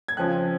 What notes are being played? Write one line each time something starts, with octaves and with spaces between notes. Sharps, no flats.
G#6
F2 C#3 F3 F#6